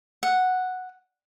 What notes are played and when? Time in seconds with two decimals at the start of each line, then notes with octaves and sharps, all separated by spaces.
0.23 F#5